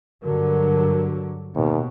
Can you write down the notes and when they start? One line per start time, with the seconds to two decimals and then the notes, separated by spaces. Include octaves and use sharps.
0.24 G2 D3 F#3 A#4
1.55 D#2 B2